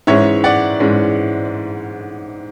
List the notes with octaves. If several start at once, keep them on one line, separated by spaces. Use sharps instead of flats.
G#2 E3 G#3 C#4 C#5 E5
D5 F#5
G#2 E3 G#3 C#4